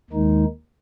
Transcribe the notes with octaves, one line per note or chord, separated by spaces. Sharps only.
D#2 D#3 G#3 D#4